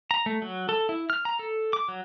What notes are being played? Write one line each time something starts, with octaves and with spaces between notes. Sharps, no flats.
A#5
A3
F#3
A4
E4
F6
A#5
A4
D6
F#3